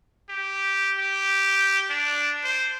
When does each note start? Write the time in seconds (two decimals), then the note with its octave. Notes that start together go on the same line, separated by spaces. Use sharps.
0.29 G4
0.98 G4
1.90 D4
2.44 C5